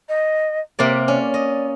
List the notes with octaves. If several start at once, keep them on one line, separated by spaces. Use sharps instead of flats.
D#5
C3 A#3 D5 E5
C#4 D5
D#5